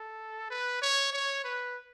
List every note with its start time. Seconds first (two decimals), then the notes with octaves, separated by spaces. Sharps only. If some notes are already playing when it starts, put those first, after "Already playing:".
Already playing: A4
0.50 B4
0.82 C#5
1.13 C#5
1.44 B4